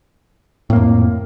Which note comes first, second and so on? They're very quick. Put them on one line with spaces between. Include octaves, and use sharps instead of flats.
A2 A#3 F2